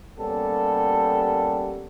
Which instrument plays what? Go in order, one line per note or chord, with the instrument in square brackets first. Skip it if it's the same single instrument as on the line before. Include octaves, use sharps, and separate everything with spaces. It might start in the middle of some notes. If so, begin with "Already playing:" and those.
[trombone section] G3 A#3 B3 C#4 G4 A4